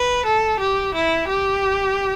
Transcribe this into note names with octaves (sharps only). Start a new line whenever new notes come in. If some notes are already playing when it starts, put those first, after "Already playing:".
Already playing: B4
A4
G4
E4
G4